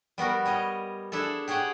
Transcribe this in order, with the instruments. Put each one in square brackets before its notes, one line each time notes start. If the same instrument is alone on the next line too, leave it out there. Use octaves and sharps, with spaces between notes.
[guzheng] G3 B3 F#4 A#4
G3 C#5 D#5
D4 E4 G#4 A4
G4 G#4 C#5 F#5 G5